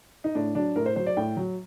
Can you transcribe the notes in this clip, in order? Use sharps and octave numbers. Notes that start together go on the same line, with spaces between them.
D#4
A2 D4
F#3 D4
A2 A#4
C5
F#3 C5
D5
A2 G5
F#3